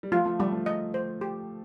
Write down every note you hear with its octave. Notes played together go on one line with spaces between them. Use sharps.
G3
F3 A3 F4
F3 A3
F3 G3 A3
F3 A3
D#5
C5
G4